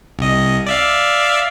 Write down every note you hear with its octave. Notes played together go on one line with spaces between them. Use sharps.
C2 D#5
D5 E5 F5